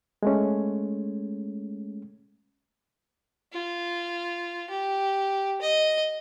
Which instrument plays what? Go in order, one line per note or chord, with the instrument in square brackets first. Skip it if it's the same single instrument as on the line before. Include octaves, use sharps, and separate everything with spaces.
[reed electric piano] G#3 A3 C#4
[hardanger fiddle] F4
G4
D#5